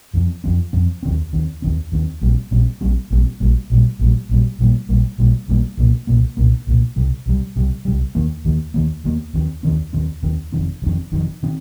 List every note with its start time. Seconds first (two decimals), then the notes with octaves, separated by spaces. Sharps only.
0.14 F2 F3 C4
0.44 F2 F3 C4
0.73 F2 F3 C4
1.03 D#2 D#3 C4
1.33 D#2 D#3 C4
1.62 D#2 D#3 C4
1.92 D#2 D#3 C4
2.21 A#1 A#2 G3 C4
2.51 A#1 A#2 G3 C4
2.81 A#1 A#2 G3 C4
3.10 A#1 A#2 G3 C4
3.40 A#1 A#2 G3
3.70 A#1 A#2 G3
3.99 A#1 A#2 G3
4.29 A#1 A#2 G3
4.59 A#1 A#2 G3 A#3
4.89 A#1 A#2 G3 A#3
5.18 A#1 A#2 G3 A#3
5.48 A#1 A#2 G3 A#3
5.77 C2 A#2 A#3
6.07 C2 A#2 A#3
6.37 C2 A#2 A#3
6.67 C2 A#2 A#3
6.96 C2 C3 G3
7.26 C2 C3 G3
7.56 C2 C3 G3
7.85 C2 C3 G3
8.15 D#2 D#3 A#3
8.45 D#2 D#3 A#3
8.74 D#2 D#3 A#3
9.04 D#2 D#3 A#3
9.34 D#2 D#3 C4
9.63 D#2 D#3 C4
9.93 D#2 D#3 C4
10.22 D#2 D#3 C4
10.52 F1 F2 D#3 C4
10.82 F1 F2 D#3 C4
11.11 F1 F2 D#3 C4
11.43 D#3 C4